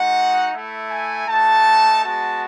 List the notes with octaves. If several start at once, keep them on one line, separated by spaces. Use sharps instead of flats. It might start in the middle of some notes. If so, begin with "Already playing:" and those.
Already playing: G#3 D#4 F#4 F#5
A3 E4
G#5
A3 D#4 F#4 A5
G#3 B3 F#4 A5